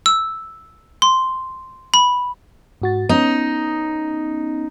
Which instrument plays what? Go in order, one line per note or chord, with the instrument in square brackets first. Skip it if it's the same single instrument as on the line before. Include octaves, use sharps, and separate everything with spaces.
[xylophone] E6
C6
B5
[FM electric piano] G#2 F#4 A6
[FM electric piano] B3 C#4 [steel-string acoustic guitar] D#4